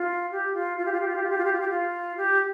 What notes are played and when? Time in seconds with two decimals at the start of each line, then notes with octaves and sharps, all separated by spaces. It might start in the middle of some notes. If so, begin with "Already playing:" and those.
Already playing: F4
0.31 G4
0.54 F4
0.77 F4
0.86 G4
0.92 F4
1.01 G4
1.08 F4
1.16 G4
1.23 F4
1.30 G4
1.38 F4
1.45 G4
1.53 F4
1.60 G4
1.69 F4
2.17 G4